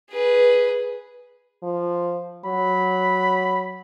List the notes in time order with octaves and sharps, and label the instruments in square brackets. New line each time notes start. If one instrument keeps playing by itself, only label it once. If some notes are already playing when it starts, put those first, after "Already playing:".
[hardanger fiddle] G#4 B4
[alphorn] F3
[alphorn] F#3 [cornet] B5